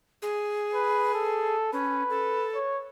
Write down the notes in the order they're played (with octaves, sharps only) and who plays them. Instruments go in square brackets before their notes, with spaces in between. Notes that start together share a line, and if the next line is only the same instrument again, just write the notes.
[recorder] G#4
[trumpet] B4
A4
[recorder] C#4 [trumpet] B4
[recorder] A4
[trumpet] C#5